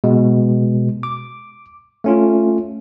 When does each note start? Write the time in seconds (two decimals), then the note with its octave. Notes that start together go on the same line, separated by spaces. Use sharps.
0.04 B2 G#3
1.03 D6
2.04 A3 C#4 F4